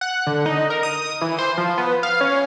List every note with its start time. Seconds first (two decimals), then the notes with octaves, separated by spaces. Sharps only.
0.01 F#5
0.27 D3
0.46 D#4
0.70 A#4
0.83 D#6
1.21 E3
1.39 C5
1.58 F3
1.78 B3
2.03 F5
2.21 C#4